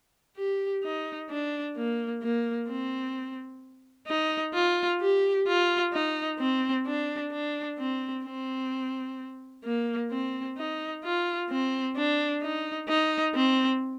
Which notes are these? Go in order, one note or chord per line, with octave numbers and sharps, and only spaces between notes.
G4
D#4
D4
A#3
A#3
C4
D#4
F4
G4
F4
D#4
C4
D4
D4
C4
C4
A#3
C4
D#4
F4
C4
D4
D#4
D#4
C4